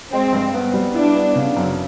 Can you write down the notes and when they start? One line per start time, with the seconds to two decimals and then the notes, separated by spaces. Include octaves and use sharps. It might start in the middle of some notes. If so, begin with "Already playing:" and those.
0.13 G#3 C4
0.33 G2
0.54 B3
0.74 G3
0.95 D4 E4
1.15 B3
1.35 C#3
1.56 F#2